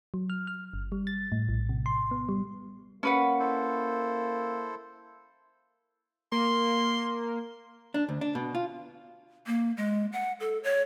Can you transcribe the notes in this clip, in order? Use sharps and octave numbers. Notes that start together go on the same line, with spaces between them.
F#3
F6
F6
G1
G3
A6
A2
A#1
C3
C6
B3
G3
A#3 C#4 B4 F#5
E4 A4 C5
A#3 C6
D4
D2
D4
B2
F4
A#3
G#3
F#5
A4
C#5